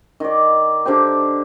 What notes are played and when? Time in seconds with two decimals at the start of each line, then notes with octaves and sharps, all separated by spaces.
0.20 D#3 D5
0.86 D3 G4 C5 G5